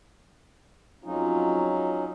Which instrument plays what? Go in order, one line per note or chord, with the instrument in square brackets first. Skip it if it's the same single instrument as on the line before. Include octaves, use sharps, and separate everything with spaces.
[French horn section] F2 G#3 F4 [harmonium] F#3 C#4 D#4